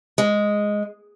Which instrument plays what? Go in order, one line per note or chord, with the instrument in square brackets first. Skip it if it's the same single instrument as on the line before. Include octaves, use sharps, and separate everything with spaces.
[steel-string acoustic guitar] G#3